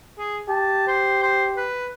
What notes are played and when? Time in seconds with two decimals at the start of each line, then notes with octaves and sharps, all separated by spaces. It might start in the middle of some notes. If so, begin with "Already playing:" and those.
0.19 G#4
0.49 G4 A5
0.88 C5
1.22 C5
1.57 B4